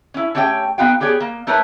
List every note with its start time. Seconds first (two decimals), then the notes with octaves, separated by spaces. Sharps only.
0.14 C#4 E4
0.35 A3 C#4 G4 C#5 D#5 G5
0.78 B3 D#4 F#4 F5 G5
1.00 B3 G4 G#4 C#5 D5
1.20 A#3
1.47 A3 D#4 A#4 B4 C#5